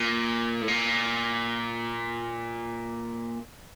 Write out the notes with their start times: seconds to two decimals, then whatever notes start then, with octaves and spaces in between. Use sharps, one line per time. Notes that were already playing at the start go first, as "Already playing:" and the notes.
Already playing: A#2
0.61 A2
0.68 A#2